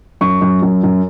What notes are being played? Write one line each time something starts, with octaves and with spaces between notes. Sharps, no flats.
F#2 C#6
F#2
F#2
F#2